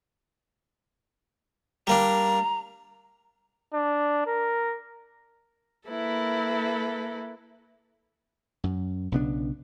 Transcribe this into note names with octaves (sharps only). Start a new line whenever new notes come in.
G3 A#3 D4 A#5
D4
A#4
A#3 E4 A4 B4
F#2
B1 C#3 B3 D4